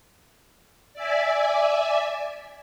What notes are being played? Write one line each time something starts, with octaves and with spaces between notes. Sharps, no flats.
D5 E5 G#5